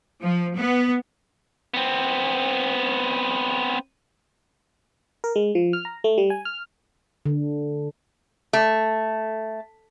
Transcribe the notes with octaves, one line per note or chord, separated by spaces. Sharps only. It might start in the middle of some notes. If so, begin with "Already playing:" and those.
F3
B3
B3 C4
A#4
G#3
F3
F6
A#5
A3
G3
G#5
F6
D3
A3